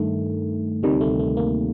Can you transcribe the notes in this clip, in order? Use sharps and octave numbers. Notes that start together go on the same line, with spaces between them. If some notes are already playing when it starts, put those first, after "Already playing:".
Already playing: G2 D#3 A3
D2 C3 D#3 G3
A3
A3
A#3